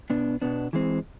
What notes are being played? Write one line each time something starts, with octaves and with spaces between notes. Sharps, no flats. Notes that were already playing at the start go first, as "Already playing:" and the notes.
B2 B3 D4
B2 B3 D4
E3 G#3 C4